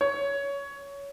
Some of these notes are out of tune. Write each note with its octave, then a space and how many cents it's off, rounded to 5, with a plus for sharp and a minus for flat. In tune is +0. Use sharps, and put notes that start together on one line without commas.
C#5 +20